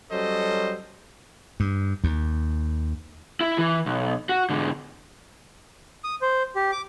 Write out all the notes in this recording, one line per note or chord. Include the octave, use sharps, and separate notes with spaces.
F#3 G3 C#4 A4 C5 D#5
G2
D#2
E4
E3
B1
F#4
G#2 D3
D#6
C5
G4
D6